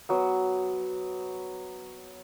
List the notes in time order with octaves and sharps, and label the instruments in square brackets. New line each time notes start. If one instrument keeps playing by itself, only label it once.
[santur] F#3 B3